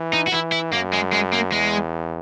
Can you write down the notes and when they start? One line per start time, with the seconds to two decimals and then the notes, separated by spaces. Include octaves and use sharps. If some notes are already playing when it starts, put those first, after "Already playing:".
Already playing: E3
0.13 D#4
0.27 F#4
0.32 E3 E4
0.52 E4
0.73 F#2 A#3
0.93 G#3
1.13 G#3
1.33 A#3
1.52 E2 G#3